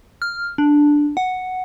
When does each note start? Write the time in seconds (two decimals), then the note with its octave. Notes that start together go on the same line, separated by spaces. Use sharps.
0.22 F6
0.58 D4
1.17 F#5